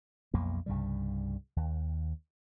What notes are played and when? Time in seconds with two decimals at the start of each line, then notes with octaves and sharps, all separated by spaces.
0.34 B1 F2 A#3
0.66 C2 G2 C#3 G3
1.56 D#2